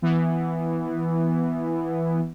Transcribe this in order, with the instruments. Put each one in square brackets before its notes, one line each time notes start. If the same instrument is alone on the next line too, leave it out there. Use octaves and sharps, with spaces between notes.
[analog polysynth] E3 B3